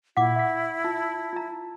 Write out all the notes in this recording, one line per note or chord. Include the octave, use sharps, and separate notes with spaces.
A#2 E4 F#5 D6 B6
E5 B6
F4 A5
F4 A#5